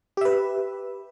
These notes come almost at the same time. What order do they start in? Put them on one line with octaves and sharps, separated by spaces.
G4 E5 B4